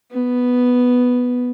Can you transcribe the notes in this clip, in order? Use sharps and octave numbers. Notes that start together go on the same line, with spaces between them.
B3